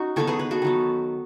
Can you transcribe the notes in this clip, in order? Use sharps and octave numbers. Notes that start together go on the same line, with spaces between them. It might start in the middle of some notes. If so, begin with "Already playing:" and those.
Already playing: C#4 D#4 F#4
D#3 F#3 B3 A4 C#5
G#4 B4
G#4 B4
F#4 A4
D#3 F#3 B3